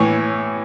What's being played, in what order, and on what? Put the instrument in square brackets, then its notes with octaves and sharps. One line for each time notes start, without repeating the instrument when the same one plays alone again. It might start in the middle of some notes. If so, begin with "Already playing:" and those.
Already playing: [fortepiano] A2 E3 C#5